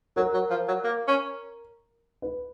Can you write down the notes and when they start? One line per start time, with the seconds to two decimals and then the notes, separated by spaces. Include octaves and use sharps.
0.16 F#3 A#4
0.34 F#3
0.50 F3
0.68 F#3
0.84 A#3
1.07 C#4
2.22 B4